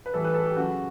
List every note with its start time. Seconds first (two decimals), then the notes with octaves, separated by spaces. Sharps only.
0.06 B4
0.14 A2 E3 G3 A4
0.24 B4
0.34 A4
0.45 G4
0.56 C#3 F#3 F#4